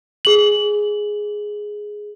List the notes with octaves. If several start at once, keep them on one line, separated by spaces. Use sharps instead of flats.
G#4 F#7